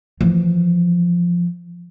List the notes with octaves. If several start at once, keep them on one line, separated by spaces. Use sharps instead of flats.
E3 F3